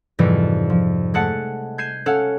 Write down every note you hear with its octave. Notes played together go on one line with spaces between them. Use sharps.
F2 G#2 C3 E3 F3 G3
F3
G#3 A3 F#5 A5 C#7
G6 G#6 C7 D#7 E7
C#4 A4 F5 F#5 A5